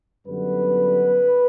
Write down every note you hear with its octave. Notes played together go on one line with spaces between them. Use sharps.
F#2 D3 G3 B3 B4